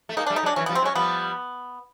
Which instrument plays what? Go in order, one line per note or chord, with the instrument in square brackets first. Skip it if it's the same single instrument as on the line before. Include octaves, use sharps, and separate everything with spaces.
[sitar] A3
[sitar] G#3 A#3 [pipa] D#4
[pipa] D4
[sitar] G3 A3
[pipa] D#4
[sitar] F#3 G#3
[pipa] D4
[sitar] E3 F#3 [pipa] C#4
[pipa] B3
[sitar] F3 G3
[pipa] C4
[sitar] F#3 G#3
[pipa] C#4
[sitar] F3 G3 [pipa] B3